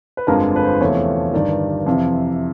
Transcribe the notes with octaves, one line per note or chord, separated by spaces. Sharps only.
B4
G1 F2 D3 F3 G#3 A#4
B4
C5
E2 C3 F3 A3 C#5
G1 G2 D#3 D5
F2 C3 E3